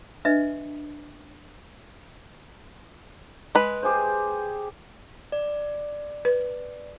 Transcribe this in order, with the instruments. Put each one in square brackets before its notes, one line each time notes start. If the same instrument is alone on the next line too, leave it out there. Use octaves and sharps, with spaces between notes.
[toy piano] D4 B4 D#5 E5
[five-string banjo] G#3 B4
[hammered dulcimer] G4 G#4 C5
[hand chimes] D5
[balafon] B4